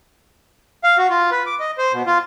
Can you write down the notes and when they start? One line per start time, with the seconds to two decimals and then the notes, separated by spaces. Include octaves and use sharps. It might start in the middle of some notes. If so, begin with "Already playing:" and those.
0.84 F5
0.98 F#4
1.10 F4
1.31 B4
1.46 D6
1.60 D#5
1.78 C5
1.93 B2
2.06 F4